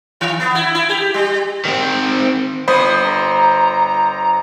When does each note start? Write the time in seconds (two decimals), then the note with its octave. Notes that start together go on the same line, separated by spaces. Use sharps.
0.21 D#3
0.40 B3
0.55 E4
0.75 E4
0.89 G4
1.14 G3
1.65 D#3 C4
2.68 G1 C5 B5 D#6
3.04 A#5